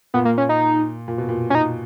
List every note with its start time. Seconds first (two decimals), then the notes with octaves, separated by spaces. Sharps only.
0.14 A#2 B3
0.25 A#3
0.38 C#4
0.49 D#4
1.08 A#2
1.18 B2
1.29 A#2
1.50 C#4
1.55 D#4